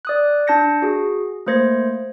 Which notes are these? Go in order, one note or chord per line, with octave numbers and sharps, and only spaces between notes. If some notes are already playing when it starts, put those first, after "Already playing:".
D5 D#6 F#6
D4 A5 G6 A#6 C#7
F#4 G#4
A3 A#3 C5 G#6 A#6